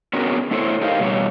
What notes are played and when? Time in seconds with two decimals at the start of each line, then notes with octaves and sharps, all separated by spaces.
0.13 B3 C#4 D4 F#4 G#4 A#4
0.51 A3 E4 A4 C5 C#5
0.81 D4 D#4 G4 A#4 D#5 F5
1.00 B2 G3 C5 C#5